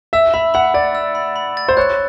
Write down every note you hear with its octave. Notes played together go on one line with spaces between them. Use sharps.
E5 E6
E5 B5
F#5 B5
D5 A6
E6
B5
B5
A6
C5
C#5 F#6